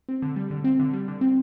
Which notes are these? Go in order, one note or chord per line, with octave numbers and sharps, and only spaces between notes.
C4
D3
G3
D3
C4
D3
G3
D3
C4